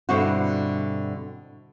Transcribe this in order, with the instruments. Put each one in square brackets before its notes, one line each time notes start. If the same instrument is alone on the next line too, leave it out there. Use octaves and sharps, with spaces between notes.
[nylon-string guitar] G2 B2 D3 C4 E4 F#4